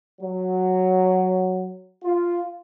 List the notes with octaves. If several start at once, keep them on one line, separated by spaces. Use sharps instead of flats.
F#3
F4